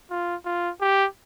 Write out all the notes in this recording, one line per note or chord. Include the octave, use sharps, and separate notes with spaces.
F4
F4
G4